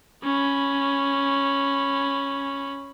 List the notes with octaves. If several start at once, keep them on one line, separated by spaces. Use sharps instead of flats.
C#4 B5